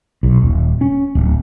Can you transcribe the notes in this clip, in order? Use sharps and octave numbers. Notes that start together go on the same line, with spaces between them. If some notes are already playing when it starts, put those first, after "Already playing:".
B1
D#1
C#4
D1